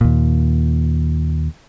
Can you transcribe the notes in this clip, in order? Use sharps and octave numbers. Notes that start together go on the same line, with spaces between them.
D#2 A#2